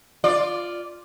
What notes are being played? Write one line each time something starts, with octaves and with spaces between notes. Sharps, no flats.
F4 D5